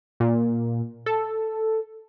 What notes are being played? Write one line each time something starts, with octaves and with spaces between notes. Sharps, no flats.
A#2
A4